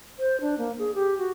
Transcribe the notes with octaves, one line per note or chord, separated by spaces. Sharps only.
C5
D4
A#3
G#4
G4
F#4